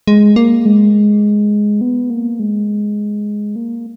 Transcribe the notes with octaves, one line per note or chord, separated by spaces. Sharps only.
G#3
A#3
G#3
B3
A#3
G#3
A#3